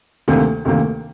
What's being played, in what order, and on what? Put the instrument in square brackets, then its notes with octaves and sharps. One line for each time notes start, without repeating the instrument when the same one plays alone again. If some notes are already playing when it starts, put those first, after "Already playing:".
[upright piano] D2 C3 D#3 A#3
D2 C3 D#3 A#3